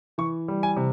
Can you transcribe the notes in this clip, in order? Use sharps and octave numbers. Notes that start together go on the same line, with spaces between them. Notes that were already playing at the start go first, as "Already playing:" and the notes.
E3 C#6
G3
G#5
C3